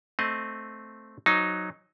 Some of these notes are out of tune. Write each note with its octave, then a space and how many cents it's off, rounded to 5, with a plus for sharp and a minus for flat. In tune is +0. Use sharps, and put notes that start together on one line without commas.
A3 +0 C4 +0 D#5 +0
F#3 +0 D#4 +0 C5 +0